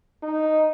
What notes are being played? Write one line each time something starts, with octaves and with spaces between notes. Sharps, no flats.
D#4